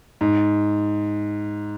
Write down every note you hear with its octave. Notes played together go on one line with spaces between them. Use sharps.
G#2